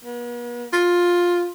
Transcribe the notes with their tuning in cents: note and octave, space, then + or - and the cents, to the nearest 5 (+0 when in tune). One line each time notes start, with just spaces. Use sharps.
B3 -45
F4 +10